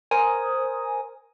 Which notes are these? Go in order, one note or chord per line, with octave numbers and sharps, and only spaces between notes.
A#4 C5 G#5 D#6